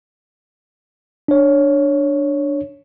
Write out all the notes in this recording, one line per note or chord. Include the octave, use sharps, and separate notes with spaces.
D4 C#5